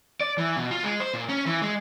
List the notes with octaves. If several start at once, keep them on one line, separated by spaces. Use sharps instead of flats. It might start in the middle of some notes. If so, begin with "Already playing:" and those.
D5
E3
B2
F4
G#3
C5
A#2
C#4
E3
G#3